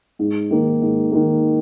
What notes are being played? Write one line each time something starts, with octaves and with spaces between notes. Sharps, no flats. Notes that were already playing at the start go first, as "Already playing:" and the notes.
G#2
D#3 A#3
G#2
D#3 A#3